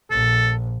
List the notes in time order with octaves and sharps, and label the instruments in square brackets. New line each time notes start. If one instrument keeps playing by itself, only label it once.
[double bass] A#1 [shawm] A4